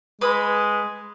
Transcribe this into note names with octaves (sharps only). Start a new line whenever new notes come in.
G#3 B4 B5 D#6